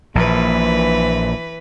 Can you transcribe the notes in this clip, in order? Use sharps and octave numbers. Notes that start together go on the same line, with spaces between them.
A#1 A#2 E3 B4